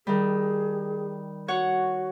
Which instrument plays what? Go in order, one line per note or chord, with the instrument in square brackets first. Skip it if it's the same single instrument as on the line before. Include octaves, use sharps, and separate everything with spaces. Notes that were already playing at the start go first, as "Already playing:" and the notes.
[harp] D#3 G3 [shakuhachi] G#4
[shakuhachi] F#4 [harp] C#5 F#5